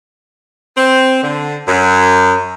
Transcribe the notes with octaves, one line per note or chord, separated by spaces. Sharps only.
C4
D3
F#2